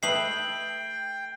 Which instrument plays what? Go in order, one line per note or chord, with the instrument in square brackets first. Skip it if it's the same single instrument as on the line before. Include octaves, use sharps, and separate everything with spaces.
[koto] A3 B4 D#5 [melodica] G5 [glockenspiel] C7 F#7